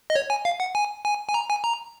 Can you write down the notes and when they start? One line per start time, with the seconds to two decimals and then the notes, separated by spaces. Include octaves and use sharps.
0.10 D#5
0.16 C#5
0.30 G#5
0.45 F5
0.60 F#5
0.75 G#5
1.05 G#5
1.29 G#5
1.34 A#5
1.50 G#5
1.64 A#5